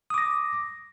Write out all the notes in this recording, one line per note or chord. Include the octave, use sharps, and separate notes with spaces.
D6 D#6 A#6